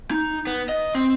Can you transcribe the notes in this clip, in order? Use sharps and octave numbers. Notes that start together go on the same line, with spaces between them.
D#4
B3
D#5
C4